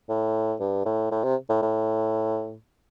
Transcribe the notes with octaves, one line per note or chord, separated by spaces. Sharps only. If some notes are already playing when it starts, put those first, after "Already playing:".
A2
G2
A2
A2
C3
A2
A2